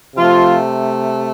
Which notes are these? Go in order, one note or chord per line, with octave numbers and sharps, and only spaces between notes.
C3 F3 A3 F4